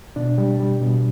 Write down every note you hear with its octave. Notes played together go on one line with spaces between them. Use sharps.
B2 D4
G3
G3
B2